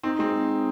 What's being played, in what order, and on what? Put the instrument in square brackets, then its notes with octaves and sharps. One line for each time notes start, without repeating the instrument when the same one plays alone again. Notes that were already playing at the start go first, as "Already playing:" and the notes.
[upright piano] C4 [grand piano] D#4
[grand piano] G#3 [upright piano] C4